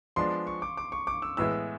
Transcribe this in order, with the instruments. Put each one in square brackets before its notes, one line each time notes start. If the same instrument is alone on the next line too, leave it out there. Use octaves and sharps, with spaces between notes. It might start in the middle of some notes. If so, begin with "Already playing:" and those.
[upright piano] F3 G#3 B3 D4 [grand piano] C6
[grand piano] C#6
D6
D6
C#6
D6
E6
[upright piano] A2 E3 G#3 B3 E4 [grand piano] E6